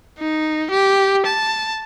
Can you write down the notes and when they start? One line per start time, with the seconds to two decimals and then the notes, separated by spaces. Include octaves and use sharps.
0.18 D#4
0.71 G4
1.27 A5